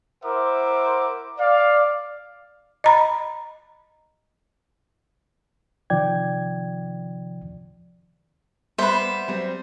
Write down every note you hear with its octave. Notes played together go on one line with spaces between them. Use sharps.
E4 A#4 C5 E5 F#5 D6
D5 F5
D#5 A#5 B5
C3 D#3 F3 D5 G5 G#6
G3 A#3 B3 B4 C5 E5
F#3 G3 C4